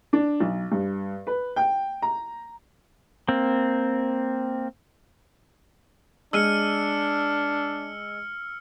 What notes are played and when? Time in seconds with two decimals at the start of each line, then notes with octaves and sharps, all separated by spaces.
0.13 D4
0.40 B1
0.72 G2
1.27 B4
1.56 G5
2.02 A#5
3.28 A#3 C4
6.33 G#3 D4 E6 F6 C#7 D#7